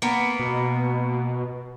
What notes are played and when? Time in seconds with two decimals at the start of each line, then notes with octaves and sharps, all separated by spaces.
0.02 A#3 B3
0.39 B2